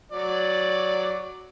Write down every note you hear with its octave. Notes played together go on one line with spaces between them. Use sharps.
F#3 D5